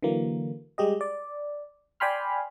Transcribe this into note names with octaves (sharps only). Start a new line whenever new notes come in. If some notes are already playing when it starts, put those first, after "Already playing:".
D3 E3 F#3 A#3
G3 G#3 G4 D#5
D5
D5 G5 G#5 B5 C6 F6